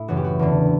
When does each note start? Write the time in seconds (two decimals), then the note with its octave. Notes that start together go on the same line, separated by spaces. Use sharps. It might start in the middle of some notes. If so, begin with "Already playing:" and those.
Already playing: A2 E4
0.08 F#2 C#3 E3 F#4
0.17 G4
0.24 F#4
0.39 E2 D3